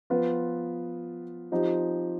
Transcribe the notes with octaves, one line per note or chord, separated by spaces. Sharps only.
F3 B3 F4 B4
F3 C4 D#4 G4